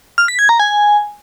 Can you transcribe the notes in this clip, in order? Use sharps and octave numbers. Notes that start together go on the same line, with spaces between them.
F6
B6
G#6
A#5
G#5